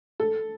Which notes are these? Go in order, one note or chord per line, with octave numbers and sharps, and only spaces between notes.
A4